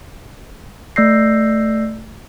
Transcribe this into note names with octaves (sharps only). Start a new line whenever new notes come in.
A3 D5 E6 G6 A#6 C7